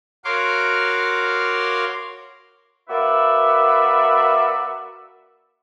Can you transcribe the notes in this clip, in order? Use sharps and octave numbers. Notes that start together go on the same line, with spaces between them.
F#4 A#4 C#5 F5 C6 D6
A#3 F#4 B4 D5 E5